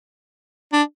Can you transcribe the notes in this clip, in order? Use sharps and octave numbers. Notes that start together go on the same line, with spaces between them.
D4